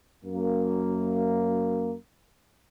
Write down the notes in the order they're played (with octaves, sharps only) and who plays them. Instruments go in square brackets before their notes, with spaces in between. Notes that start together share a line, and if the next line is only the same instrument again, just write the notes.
[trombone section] F#2 A#3